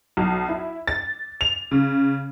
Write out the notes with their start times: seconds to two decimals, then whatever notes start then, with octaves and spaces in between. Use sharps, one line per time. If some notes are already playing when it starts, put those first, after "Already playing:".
0.17 B1
0.49 E4
0.88 A6
1.41 F7
1.71 C#3